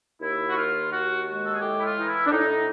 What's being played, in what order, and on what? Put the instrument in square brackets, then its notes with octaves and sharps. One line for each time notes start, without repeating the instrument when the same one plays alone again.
[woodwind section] D#2 E4
F#4
D#3 F4
D#2 F#4
G#3 F#4
A4
G#4
A2 G4
E4
F4
E3 D#4
E4
D4
A2 D#4